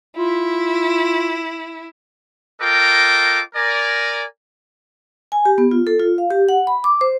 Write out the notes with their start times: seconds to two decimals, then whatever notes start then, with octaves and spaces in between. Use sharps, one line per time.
0.17 E4 F4
2.61 F4 A4 A#4 D#5 G5 D6
3.55 A#4 D5 G#5
5.32 G#5
5.45 G4
5.58 B3
5.71 F4
5.87 A4
6.00 F4
6.18 F5
6.31 G4
6.49 F#5
6.67 B5
6.84 D6
7.01 C5